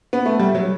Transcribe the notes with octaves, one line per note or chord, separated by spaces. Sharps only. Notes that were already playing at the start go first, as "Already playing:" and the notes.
B3
A3
G3
F#3